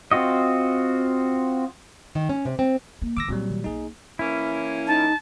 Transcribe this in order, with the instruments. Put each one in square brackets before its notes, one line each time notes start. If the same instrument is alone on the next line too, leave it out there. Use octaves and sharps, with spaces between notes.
[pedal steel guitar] C4 F4 F#4 D#5
[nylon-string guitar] D#3
C#4
C3
C4
[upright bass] A#3
[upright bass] D#3 F#3 [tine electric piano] D6 E6 A#6
[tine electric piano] A#2 F#3 G3 [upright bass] C4 F4
[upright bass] D#3
[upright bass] B1 A#3 [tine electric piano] D#4 G#4
[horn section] E3 A#3 C#4 [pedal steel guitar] E4
[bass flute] D#4 [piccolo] A5